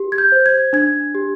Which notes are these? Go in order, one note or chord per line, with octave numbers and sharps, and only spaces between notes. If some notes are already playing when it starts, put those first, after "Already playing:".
Already playing: G4
G#6
G6
C5
G#6
D4 G#6
G4